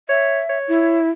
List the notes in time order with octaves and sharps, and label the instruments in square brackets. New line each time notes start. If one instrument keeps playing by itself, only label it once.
[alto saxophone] C#5 [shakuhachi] E5
[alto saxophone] C#5
[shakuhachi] E4